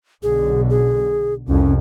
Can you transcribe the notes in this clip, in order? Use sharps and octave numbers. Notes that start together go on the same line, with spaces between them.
B1 D3 G#4
G#4
C2 F2 C#4